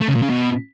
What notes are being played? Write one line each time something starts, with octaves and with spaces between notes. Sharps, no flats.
A3
C#3
A#2
C#3
B2